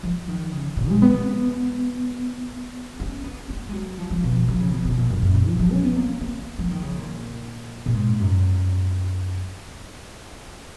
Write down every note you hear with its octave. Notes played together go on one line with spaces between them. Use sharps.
F3
D#3
C#3
A#2
G#3
B3
C#4
B3
A#3
G#3
F#3
F3
F3
B2
F3
F3
C#3
B2
B2
A#2
F#2
F#2
A#2
F3
F3
C#4
B3
A#3
A#3
F3
D#3
C#3
A#2
A#2
G#2
F#2